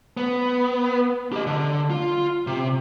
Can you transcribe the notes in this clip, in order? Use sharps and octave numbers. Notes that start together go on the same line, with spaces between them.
B3
G4 D#5
D3
F4
C3